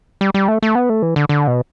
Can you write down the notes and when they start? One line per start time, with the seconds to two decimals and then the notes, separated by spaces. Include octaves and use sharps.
0.21 G3
0.34 G3
0.48 A3
0.62 A3
0.75 B3
0.89 A3
1.02 E3
1.16 D3
1.29 D3
1.47 B2